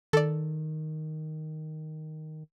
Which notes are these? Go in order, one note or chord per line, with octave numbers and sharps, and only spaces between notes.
D#3 A4 D5